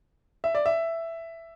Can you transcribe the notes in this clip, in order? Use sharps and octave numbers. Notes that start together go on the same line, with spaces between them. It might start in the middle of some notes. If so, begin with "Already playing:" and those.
E5
D5
E5